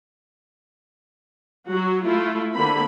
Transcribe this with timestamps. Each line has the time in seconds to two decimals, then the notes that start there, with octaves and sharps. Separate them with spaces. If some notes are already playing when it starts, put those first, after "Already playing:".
1.69 F#3 F#4
2.06 A3 E4 F4
2.55 D3 A#3 C4 B5